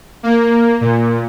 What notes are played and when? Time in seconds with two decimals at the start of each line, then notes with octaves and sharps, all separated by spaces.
0.23 A#3
0.81 A#2